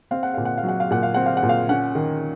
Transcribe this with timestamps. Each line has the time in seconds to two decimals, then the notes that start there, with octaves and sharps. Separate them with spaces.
0.11 C4 F5
0.23 F#5
0.34 A#2 F5
0.45 F#5
0.58 F5
0.63 F#3
0.68 F#5
0.80 F5
0.91 A#2 F#5
1.03 F5
1.14 C4 F#5
1.26 F5
1.37 F#5
1.43 A#2
1.49 F5
1.69 C#4 F#5
1.95 D#3